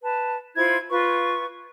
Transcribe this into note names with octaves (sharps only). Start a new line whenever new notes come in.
B4 A5
E4 F4 C5 G#6
F4 B4 C#6